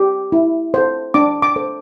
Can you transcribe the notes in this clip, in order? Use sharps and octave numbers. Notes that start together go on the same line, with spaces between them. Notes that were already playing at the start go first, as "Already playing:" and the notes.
Already playing: G4
E4
A4 C5
D4 D6
D6
A4 C5